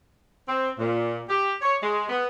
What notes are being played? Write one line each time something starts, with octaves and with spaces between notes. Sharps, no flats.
C4
A#2
G4
C#5
G#3
B3